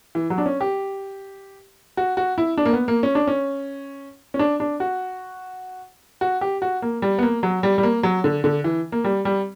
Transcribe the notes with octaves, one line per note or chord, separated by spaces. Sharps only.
E3
F#3
D4
C#4
G4
F#4
F#4
E4
D4
A#3
B3
A#3
C#4
D4
C#4
C#4
D4
D4
F#4
F#4
G4
F#4
A#3
G3
B3
A#3
F#3
G3
G3
A#3
F#3
D3
D3
E3
A#3
G3
G3